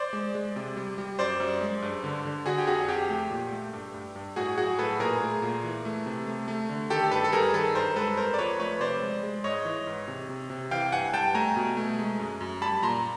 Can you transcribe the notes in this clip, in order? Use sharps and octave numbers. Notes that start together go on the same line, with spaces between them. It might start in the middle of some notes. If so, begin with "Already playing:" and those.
Already playing: C5 D5
G#3
G#3
C3
G3
G3
F#2 C5 D5
F#2
G#3
G2
D3
D3
D3 F#4 G#4
G4
F2 F#4 G#4
F2 G4
A3
A#2
A3
G2
G2
G2
A2 F#4 G#4
F#3 F#4 G#4
A2 A4 B4
A#2 G#4 A#4
A3
A#2
E3
A3
C3
A3
A3
D3
D#3 G4 A4
G2 A4 B4
A4
G3 G#4 A#4
D#3 A4 B4
G2 A#4 C5
G#3 A4 B4
F2 A#4 C5
D5
F3 B4 C#5
A3 B4 C#5
C3 C5 D5
G#3
G#3
G#2 C#5 D#5
E3
G#2
C3
C3
C3
E3 F5 G5
G2 F#5 G#5
G3 G5 A5
A3 G#5 A#5
B2
A3
G#3
F#2
F#2
G3 A5 B5
A#2 A#5 C6